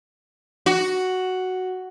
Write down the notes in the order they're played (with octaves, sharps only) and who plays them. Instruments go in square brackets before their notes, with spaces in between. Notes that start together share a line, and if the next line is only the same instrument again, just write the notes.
[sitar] F#4